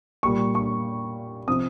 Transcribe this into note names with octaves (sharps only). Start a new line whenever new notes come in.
A#2 G3 A#3 C#6
C#6
C3 F3 C4 D#6